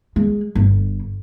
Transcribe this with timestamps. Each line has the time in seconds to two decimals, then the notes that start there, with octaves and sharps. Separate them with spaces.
0.16 G#3
0.55 G1